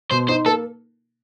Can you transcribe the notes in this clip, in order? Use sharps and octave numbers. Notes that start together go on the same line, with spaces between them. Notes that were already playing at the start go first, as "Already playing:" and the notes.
B2 C5
D#4 C5
A#3 A4